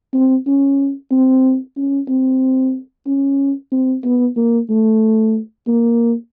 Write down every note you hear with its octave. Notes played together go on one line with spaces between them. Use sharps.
C4
C#4
C4
C#4
C4
C#4
C4
B3
A#3
A3
A#3